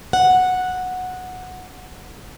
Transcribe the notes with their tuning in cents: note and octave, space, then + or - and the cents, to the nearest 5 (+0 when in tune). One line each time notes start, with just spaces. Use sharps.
F#5 -10